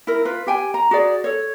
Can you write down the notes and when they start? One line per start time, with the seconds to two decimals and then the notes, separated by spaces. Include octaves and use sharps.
0.07 E4 A#4
0.25 F4 B4
0.47 G4 G5 G#5
0.74 A#5
0.91 F#4 G#4 D5
1.24 A4 C#5